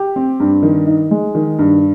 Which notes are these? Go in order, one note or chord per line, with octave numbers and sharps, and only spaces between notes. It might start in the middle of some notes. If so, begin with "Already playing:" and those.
Already playing: G4
C4
G2
D#3
D#4
G#3
D#3
G2